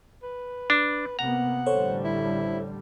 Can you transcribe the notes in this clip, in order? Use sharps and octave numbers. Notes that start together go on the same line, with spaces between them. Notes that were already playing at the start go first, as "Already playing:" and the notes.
B4
D4
C3 A#3 B3 F#5 A#5
A1 D3 G3 A4 C5 C#5
E4